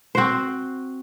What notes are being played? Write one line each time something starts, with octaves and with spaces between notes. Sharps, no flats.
C4 F#4 C5